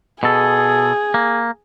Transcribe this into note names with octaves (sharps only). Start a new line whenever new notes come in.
B2 G#4 A4
A#3